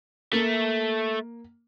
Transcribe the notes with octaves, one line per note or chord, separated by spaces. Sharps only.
A3 A#3